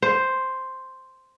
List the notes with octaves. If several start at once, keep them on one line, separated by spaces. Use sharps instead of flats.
C5